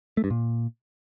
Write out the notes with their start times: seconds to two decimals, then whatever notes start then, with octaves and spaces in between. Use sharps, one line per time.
0.17 A3
0.24 G2
0.30 A#2